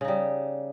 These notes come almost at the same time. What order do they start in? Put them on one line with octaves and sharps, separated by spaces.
C#3 D#4 G3